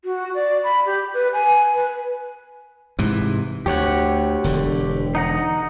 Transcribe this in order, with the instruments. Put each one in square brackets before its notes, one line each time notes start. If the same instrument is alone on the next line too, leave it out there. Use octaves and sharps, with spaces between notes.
[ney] F#4
D5
B5
G4
B4
G#5
B4
[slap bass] G#2 C3 E3
[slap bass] D2 [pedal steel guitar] G4 C#5 F#5
[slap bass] E1 D3
[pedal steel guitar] D#4 F#5 A#5